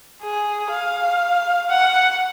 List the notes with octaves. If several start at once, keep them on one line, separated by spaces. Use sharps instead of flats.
G#4
F5
F#5